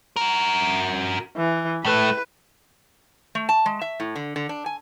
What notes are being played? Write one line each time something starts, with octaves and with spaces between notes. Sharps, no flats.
F#4 A#4
E3
A2 A3 B4
A3
A5
G#3
E5
A2
D3
D3
D4
G#5